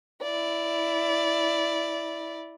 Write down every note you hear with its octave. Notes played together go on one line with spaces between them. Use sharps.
E4 D5